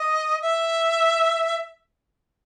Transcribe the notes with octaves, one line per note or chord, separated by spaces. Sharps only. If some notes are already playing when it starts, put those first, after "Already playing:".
Already playing: D#5
E5